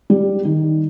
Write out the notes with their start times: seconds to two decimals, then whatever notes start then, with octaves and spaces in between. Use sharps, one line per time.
0.10 G3
0.45 D#3